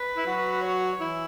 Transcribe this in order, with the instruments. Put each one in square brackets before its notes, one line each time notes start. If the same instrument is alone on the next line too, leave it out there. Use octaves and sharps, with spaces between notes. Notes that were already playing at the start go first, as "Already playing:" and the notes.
Already playing: [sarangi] B4
[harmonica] E4
F#3 F#4
[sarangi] C#5
[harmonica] E3 E4